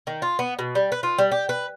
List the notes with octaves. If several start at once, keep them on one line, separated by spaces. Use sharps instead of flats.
D#3
F4
B3
B2
G3
B4
F4
G3
G4
B4